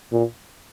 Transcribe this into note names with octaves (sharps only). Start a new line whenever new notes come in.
A#2